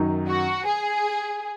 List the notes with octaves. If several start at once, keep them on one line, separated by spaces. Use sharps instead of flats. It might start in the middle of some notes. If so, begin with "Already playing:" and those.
Already playing: F#2 D#3 F#3 D#4
F#4
G#4